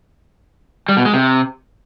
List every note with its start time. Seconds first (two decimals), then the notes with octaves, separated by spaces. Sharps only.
0.89 G3
0.97 B2
1.05 G#3
1.14 C3